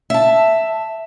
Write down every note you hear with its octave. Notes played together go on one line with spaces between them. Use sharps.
E5 A5